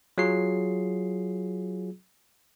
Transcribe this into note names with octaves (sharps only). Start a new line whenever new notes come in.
F#3 F4 G#4 C7